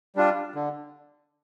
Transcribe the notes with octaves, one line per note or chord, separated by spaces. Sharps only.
G3 D4 F4
D3